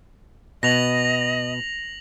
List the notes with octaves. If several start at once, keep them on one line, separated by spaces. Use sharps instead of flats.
B2 B3 D#5 A#6 F7 F#7